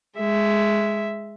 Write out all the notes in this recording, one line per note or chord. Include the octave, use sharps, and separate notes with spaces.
G#3 E5